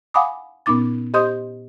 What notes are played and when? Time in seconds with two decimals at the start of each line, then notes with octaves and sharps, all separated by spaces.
0.14 F5 F#5 G#5 B5 D6 D#6
0.66 A#2 B3 C#4 D#4 D6 A6
1.14 G4 C5 D#5 C6 D#6 G6